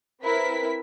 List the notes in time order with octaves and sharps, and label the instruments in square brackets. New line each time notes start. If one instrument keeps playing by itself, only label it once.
[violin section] C4 E4 A#4 B4 B6